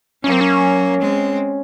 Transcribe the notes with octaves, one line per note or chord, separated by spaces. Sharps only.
F#3 A#3 C#4
C4
C#4
G#3 C4